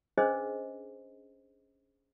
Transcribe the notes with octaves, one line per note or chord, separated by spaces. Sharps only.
C#4 D4 G#4 B4 C5 D#5